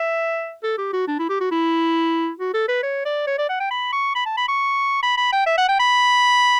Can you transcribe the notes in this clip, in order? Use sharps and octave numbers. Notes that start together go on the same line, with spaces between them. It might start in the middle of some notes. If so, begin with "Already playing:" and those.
Already playing: E5
A4
G4
F#4
D4
E4
G4
F#4
E4
F#4
A4
B4
C#5
D5
C#5
D5
F#5
G5
B5
C#6
B5
A5
B5
C#6
B5
B5
G5
E5
F#5
G5
B5